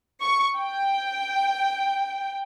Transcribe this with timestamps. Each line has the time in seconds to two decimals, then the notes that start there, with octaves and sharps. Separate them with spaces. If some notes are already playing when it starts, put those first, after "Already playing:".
0.21 C#6
0.56 G5